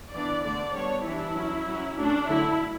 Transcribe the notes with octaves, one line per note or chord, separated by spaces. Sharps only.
E3 B3 D4 D5
D3 A3 D4 D5
G3 B3 D4 C#5
E3 G3 D4 E4
F#3 C#4
F#3 C#4
F#3 A3 C#4 D4
D3 F#3 A3 E4